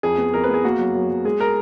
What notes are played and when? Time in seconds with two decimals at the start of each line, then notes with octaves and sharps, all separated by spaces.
0.03 F2 G#4
0.18 B3
0.34 F2 A#4
0.44 B4
0.48 B3
0.54 G#4
0.64 A#3 F#4
0.79 F#2
0.95 F#2
1.10 F#2
1.24 G#3 G#4
1.40 A#4